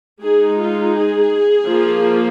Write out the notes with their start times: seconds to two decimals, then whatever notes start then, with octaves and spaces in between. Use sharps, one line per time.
0.22 G#3 D#4 G#4
0.59 F4
0.95 G#4
1.68 F3 A#3 F4